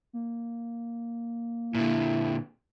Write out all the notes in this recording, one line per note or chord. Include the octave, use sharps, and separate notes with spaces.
A#3
A#2 D3 E4